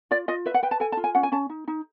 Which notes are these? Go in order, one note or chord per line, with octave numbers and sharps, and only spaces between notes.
F4 D5
F4 D#5
B4 E5
F#5
B4 G5
A5
A4 G#5
A5
F4
G#5
C#4 F#5
G#5
C#4 A5
D#4
D#4